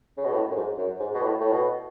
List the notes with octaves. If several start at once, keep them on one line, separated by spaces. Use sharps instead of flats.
C#3
B2
A2
F#2
G#2
F#2
G#2
B2
A2
A2
B2